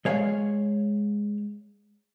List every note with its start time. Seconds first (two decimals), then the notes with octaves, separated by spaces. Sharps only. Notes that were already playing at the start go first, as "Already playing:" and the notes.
0.05 G#3 C#5 F5